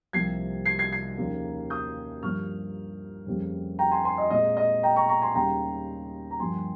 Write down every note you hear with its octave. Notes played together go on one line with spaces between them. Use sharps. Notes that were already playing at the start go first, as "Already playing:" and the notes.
C2 C3 F3 A#3 G#6 C7
G#6 C7
G#6 C7
G#6 C7
D#2 C#3 F3 A#3
D#6 G6
G2 F3 A#3 C#6 F6
F2 C#3 G3 A#3
G5 A#5
G#5 C6
G#5 C6
D#5
A#2 G#3 C4 D#5
D#5
G5 A#5
A#5 C#6
A#5 C#6
G#5 C6
D#2 C#3 G3 A#3 G5 A#5
A#5
G2 F3 A#3 G#5 C6